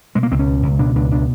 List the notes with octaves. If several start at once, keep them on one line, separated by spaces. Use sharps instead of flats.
B2 G#3
A#3
C#2 C4
C#4
B2
C#2
B2 D4
C#2 D4
B2 D4